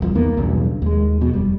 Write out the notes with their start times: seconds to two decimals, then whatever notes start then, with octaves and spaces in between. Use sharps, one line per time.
0.01 D#1 C2 F3
0.15 E2 D#3 A#3 B3
0.37 B1 E2 G2 C#3
0.82 D#2 G#3
1.21 F2 B2
1.34 F1 G3